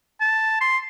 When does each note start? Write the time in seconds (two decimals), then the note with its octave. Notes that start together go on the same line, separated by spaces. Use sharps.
0.20 A5
0.61 C6